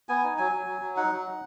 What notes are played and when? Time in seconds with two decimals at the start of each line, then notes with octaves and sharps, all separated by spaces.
0.09 B3 G#5
0.24 D#4
0.38 F#3 G#5
0.52 F#3
0.67 F#3
0.81 F#3
0.96 D#4 F#5
1.12 F#3
1.26 D#4